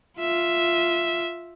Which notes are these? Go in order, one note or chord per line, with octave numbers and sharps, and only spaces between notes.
F4 E5